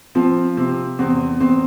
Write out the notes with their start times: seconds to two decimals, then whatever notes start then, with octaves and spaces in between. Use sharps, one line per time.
0.15 F3 C4
0.57 C3 C4
0.99 E2 C4
1.40 E2 C4